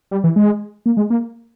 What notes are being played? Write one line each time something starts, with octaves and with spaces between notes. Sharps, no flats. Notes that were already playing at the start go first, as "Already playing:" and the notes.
G3
E3
G#3
A#3
G#3
A#3